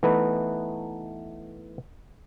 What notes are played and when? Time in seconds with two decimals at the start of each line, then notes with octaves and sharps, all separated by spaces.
0.03 E3 A3 B3 D#4 B4